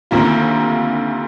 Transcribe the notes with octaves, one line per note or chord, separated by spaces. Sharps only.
D2 C3 D#3 A#3 F4